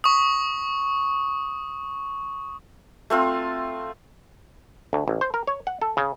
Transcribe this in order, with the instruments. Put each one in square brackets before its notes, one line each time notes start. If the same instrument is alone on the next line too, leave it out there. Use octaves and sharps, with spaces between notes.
[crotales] C#6 D#6
[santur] A3 C4 F4
[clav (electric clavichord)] D2
A1
C5
A#4
C#5
F#5
A4
C#3